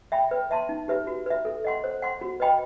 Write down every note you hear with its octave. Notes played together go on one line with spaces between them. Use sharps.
E5 G5 B5
B4
E5 A5 C6
D#4
G4 B4 E5
F#4
B4 E5
A4
D#5 F#5 C6
C5
F#5 C6
F#4
B4 D#5 G5 B5